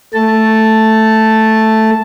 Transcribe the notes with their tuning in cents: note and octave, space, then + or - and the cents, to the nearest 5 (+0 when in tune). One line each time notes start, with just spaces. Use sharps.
A3 +0 A5 +0